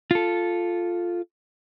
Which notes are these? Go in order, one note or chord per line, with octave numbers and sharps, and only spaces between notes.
F4 A4